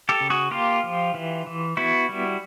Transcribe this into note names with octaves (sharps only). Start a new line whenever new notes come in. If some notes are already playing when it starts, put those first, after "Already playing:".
G4 A4
C#3
F#4 G#4
A#3 F4 G4
F3
E3
E3
B3 E4 F#4
G3